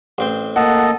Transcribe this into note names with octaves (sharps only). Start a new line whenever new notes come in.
A1 C4 C5
A#3 A4 D#5 F#5